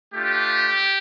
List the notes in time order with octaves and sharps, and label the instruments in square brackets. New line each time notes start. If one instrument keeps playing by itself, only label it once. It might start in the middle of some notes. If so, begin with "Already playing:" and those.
[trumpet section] A3 D4 F4 G4